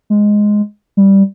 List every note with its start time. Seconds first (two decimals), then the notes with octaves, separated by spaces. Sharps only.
0.10 G#3
0.97 G3